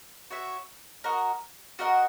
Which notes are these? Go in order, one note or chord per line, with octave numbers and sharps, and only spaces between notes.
F#4 C#5 E5
F#4 A#4 D#5 F#5
F#4 A#4 D#5 F#5